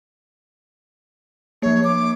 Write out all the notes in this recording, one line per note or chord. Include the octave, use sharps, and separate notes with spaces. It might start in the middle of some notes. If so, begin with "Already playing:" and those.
F3 A#3 C#5
D6